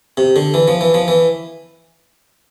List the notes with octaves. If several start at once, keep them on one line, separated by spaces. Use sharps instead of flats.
C3
D3
E3
F3
E3
F3
E3